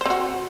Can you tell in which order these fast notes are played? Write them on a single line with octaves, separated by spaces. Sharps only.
C5 C4 F#4